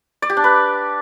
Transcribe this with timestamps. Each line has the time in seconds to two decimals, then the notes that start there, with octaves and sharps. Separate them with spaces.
0.22 D5
0.30 G4
0.37 D4
0.44 B4